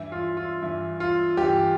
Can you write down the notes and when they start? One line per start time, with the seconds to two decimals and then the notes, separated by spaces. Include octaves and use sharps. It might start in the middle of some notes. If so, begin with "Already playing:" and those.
Already playing: G2 E3 E4
0.12 F4
0.37 F4
0.62 G2 E3 E4
1.00 F4
1.37 G2 E3 G4